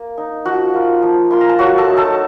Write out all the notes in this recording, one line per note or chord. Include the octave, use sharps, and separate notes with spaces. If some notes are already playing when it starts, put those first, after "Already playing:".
Already playing: A#3
D#4
F3 F#4 F#5
A#3 F4
F3
A#3 F4 C6
A#5
A5
F#3 F#4 F#5
A4 A5
A3 D#4
A4 A5